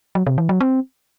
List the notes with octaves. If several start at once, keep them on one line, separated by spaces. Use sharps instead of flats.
F#3
C3
E3
F#3
C4